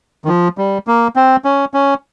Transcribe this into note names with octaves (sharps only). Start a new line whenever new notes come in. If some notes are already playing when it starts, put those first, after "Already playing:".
D#3
F3
G3
A#3
C4
C#4
C#4